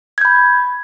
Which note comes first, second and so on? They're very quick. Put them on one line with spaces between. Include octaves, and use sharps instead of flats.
G#6 G6 B5